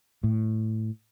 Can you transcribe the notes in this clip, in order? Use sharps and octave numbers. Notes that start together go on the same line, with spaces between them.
A2